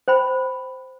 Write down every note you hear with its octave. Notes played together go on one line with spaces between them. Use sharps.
C5 G5 B5